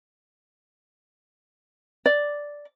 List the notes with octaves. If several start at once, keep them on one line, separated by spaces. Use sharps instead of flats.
D5